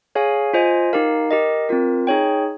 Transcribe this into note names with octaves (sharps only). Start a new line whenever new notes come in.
G#4 C#5 F5 G#5
F4 C5 D#5 G#5
D#4 G4 A#4 F5
G4 A#4 D#5
C4 F4 A#4
D#4 G#4 C#5 G5